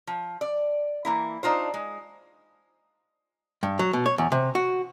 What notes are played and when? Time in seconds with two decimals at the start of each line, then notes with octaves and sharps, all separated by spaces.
0.07 F3
0.41 D5
1.05 E3 A#3 E4
1.43 D4 D#4 F4 C5
1.74 G#3
3.63 G2
3.79 F#3
3.93 B2
4.06 C#5
4.18 E2
4.32 C3
4.55 F#4